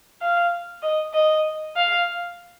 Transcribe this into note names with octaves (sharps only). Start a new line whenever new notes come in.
F5
D#5
D#5
F5